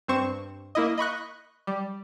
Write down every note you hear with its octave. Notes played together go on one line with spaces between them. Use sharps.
G2 C4 C5 C#6 E7
A#3 E4 D#5
D#5 B5 C#6 F#6
G3